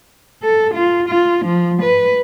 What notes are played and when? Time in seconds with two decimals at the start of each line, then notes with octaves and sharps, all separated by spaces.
0.43 A4
0.74 F4
1.08 F4
1.45 F3
1.82 B4